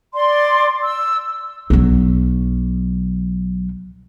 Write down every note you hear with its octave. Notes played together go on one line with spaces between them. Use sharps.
D5 C6
E6
B1 F#3